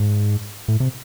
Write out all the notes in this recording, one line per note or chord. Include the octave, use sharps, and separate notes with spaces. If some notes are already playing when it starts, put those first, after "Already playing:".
Already playing: G#2
A2
C3